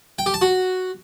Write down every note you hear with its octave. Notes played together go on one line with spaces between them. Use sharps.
G5
G4
A5
F#4